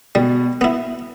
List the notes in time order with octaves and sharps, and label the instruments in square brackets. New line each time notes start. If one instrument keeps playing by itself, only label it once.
[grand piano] B2 [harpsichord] G3
[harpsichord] B3 E4